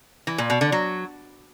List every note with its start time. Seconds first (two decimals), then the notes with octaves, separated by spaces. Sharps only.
0.27 E3
0.38 A#2
0.50 B2
0.61 D3
0.72 F#3